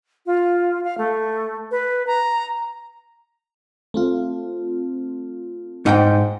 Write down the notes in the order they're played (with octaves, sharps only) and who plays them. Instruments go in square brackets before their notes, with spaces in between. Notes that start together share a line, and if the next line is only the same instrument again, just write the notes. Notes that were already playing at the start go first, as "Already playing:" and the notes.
[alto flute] F4
F5
A3
B4
A#5
[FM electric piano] A3 C4 F4
[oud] G#2 [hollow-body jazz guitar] D#4 F#5 G5